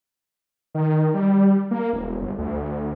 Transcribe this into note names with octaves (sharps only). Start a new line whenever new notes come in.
D#3
G3
A#3
E1
G1
D2